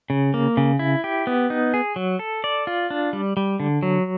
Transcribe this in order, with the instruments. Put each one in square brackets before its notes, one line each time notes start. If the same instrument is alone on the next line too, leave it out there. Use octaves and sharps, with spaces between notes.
[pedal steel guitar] C#3
A#3
C#3
E4
G4
B3
D#4
G#4
F#3
A4
D5
F4
D4
G3
G3
D3
F#3